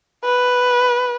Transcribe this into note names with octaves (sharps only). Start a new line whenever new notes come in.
B4